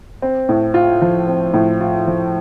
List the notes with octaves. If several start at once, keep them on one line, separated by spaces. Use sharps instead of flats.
C4
A2
F4
F3
C4
A2
F4
F3